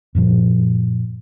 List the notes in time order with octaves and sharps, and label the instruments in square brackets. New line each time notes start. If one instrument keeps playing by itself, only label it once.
[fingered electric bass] F#2 A#2 F3